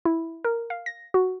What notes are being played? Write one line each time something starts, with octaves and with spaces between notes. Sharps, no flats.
E4
A#4
F5
A#6
F#4